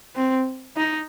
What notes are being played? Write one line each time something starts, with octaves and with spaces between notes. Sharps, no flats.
C4
D#4